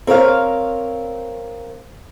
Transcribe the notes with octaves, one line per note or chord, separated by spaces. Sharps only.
C4 A#4 C#5 F5